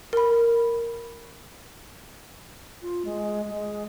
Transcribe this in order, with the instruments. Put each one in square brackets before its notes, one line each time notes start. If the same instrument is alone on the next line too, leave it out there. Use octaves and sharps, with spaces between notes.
[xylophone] A#4 B5
[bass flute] F4
G#3
G#3